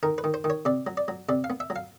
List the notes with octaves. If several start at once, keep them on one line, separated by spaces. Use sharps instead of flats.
D#3 A#4
B4
D#3
C5
D#3
C#5
C3 D5
F#3
D5
F#3
C3 D5
F5
B3
E5
F#3
F5